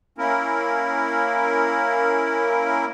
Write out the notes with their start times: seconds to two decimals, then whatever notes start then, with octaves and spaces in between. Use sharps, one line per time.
0.18 A#3 C#4 E4 A#4